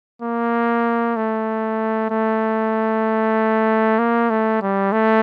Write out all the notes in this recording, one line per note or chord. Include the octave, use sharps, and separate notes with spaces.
A#3
A3
A3
A#3
A3
G3
A3